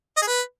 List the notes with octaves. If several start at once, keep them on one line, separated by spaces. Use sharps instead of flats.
D#5
G#4
B4